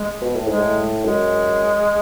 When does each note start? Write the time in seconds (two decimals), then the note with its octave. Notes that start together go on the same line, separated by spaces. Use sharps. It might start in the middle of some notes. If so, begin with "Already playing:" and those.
Already playing: G#3
0.22 B2
0.35 A2
0.47 G#2 G#3
0.58 A2
1.05 F#2 G#3